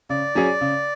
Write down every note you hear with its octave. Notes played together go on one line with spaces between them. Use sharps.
C#3 D5
F#3 C#4 G#4
C#3